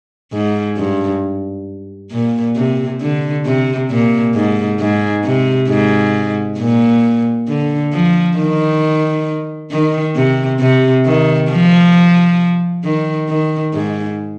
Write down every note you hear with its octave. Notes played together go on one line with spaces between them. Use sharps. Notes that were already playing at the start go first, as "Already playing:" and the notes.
G#2
G2
A#2
C3
D3
C3
A#2
G#2
G#2
C3
G#2
A#2
D3
F3
D#3
D#3
C3
C3
D#3
F3
D#3
D#3
G#2